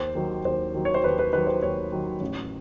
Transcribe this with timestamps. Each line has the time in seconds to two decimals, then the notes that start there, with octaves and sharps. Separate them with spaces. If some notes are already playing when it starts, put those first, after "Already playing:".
Already playing: D#2 C5
0.15 D#3 F#3
0.45 D#2 C5
0.74 D#3 F#3
0.85 C#5
0.94 C5
1.04 D#2 B4
1.19 B4
1.33 D#3 F#3 B4
1.47 C5
1.62 D#2 C#5
1.92 D#3 F#3
2.21 A1